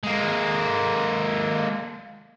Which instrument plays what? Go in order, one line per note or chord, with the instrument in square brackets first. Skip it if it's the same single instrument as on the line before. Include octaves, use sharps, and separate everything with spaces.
[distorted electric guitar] G#3 A#3